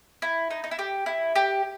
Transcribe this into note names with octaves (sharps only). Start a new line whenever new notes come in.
E4
D#4
D#4
E4
G4
E4
G4